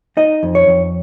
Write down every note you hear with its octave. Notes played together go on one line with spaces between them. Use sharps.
D#4 D#5
F2
C#5
F2